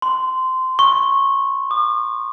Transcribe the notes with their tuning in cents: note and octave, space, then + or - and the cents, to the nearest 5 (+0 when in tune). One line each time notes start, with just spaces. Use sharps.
C6 -15
C#6 -15
D#6 -45